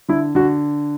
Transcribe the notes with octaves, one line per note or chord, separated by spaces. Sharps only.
D3 E4
D3 F#4